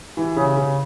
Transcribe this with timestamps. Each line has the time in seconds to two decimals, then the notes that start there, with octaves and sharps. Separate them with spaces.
0.17 E3
0.36 C#3
0.57 C#3